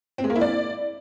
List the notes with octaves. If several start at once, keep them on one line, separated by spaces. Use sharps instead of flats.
C4
G#3
A#3
E4
D5